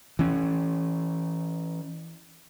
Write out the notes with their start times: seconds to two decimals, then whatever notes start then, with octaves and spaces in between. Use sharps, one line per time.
0.19 E3 C#4